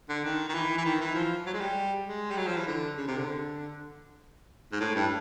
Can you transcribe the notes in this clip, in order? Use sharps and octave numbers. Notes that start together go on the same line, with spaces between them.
D3
D#3
D#3
E3
E3
D#3
E3
F3
F#3
G#3
G3
G#3
G3
F#3
F3
E3
D3
C#3
C3
D3
G#2
A2
G2